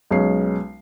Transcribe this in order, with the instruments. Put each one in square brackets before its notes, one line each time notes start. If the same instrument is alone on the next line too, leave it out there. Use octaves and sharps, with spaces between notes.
[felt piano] B1 G#3 C#4 C7